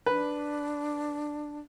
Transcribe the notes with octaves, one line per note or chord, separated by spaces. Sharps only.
D4 B4